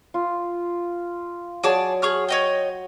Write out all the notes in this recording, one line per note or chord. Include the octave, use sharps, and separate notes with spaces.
F4
F#3 G#4 D5 A5
G#4 C#6 F6
C#5 D#5 G5